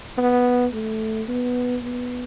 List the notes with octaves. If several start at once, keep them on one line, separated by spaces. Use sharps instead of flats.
B3
A3
B3
B3